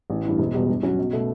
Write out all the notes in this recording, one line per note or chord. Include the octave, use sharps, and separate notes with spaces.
A1
G2 E3
E1
E2 B2 G3
G2
F#3 C#4 F#4
B1
B2 A3